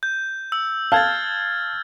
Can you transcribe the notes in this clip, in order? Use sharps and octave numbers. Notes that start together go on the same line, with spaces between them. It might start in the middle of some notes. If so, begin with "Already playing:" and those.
G6
E6
F5 A5 F6 G#6 A6